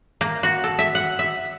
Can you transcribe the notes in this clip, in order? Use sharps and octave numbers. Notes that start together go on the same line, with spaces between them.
A#3
F#4
A4
E5
F#5
E5